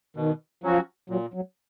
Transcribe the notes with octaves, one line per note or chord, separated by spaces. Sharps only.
B2 D#3
F3 F#3 C#4 F#4
A#2 F#3
F#3